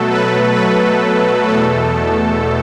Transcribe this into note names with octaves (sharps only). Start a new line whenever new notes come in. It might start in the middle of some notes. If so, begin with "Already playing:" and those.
Already playing: B2 F#3 A3 A4
B4
B4
E2 B2 A3 A4